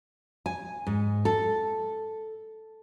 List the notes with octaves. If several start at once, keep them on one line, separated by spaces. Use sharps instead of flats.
G#5
G#2
A4